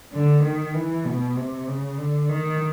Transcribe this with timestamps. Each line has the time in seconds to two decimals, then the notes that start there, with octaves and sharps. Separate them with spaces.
0.13 D3
0.43 D#3
0.74 E3
1.05 B2
1.35 C3
1.67 C#3
1.98 D3
2.29 D#3